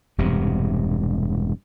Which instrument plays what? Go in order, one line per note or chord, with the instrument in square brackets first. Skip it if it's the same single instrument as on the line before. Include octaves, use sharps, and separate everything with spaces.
[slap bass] E1 G2 C3